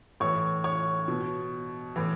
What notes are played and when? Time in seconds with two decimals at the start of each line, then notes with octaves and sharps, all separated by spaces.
0.20 A2 E3 C#5 C#6
0.64 C#5 C#6
1.08 B2
1.96 A2 E3